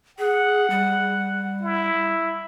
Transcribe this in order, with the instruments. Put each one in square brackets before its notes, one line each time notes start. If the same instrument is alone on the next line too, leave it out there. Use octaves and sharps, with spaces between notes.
[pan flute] G#4 [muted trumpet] F#5
[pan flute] G3
[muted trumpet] E4